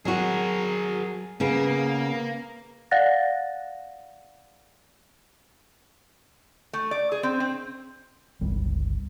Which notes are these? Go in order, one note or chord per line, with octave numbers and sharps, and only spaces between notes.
F#3 F#4 G#4 A#4
C#3 A#3 B3 G#4
D5 F5 F#5 F#6 A6 A#6
A3
D5
G#4
C4
C4
G1 C#2 G3